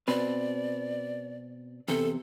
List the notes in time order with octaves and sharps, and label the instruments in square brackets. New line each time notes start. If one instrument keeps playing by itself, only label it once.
[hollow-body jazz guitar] B2 C4 B4 [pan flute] D5
[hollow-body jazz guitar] E2 C3 [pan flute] A4